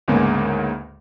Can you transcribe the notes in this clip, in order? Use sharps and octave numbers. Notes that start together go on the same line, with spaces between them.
D2 G#2 C#3 G#3 A#3 B3